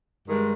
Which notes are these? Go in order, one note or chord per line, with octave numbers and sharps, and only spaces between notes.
G2 D#3 G#3